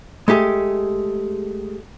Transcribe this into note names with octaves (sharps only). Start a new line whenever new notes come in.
G#3 A3 G4 G#4